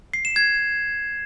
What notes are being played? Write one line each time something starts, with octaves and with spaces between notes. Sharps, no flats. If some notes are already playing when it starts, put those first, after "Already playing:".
C7
E7
G#6